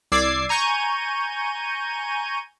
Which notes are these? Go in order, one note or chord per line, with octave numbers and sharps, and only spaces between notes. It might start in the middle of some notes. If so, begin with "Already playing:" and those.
C2 D5 D6 E6 G#6 C7
G#5 A#5 C#6 G6 D#7